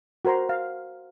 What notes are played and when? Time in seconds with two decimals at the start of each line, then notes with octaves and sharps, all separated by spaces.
0.25 F#4 A#4 C5 A#5 C6
0.49 F5